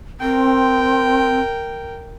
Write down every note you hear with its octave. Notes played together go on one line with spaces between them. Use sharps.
C4 A#4 G5